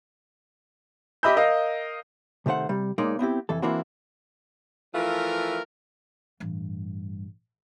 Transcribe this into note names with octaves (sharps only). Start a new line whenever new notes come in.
G4 D#5 E5 B5 E6 G6
A#4 D#5 F5
C3 D#3 A3 C5 F#5
C3 G3
B1 G#3 A#3 D#4 C#5 D5
B3 C4 E4 G4
C2 F2 E3 A4
E3 A#3 C4 D4 E4 F#4
E3 F3 A3 F4 A#4
A1 G2